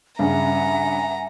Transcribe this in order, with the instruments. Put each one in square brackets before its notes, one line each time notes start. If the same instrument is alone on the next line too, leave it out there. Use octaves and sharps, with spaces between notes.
[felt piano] G2 C#3 [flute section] E5 F#5 G#5 [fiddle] A#5